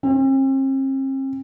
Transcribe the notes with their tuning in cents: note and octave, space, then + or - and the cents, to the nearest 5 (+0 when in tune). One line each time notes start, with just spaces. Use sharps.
C4 +45